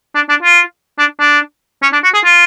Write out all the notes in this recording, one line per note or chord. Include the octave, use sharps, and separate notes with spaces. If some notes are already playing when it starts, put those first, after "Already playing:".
D4
D4
F4
D4
D4
C#4
D4
F#4
G#4
F4